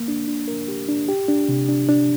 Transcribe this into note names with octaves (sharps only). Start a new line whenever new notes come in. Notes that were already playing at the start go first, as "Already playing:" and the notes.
Already playing: A#3
D4
D4
A#4
G4
D4
G4
D4
C3
D4
D4